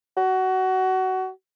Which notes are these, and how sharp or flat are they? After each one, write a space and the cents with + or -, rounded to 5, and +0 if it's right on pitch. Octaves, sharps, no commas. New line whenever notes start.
F#4 +20